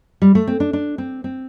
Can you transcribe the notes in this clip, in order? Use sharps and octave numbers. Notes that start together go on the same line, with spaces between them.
G3
A3
C4
D4
D4
C4
C4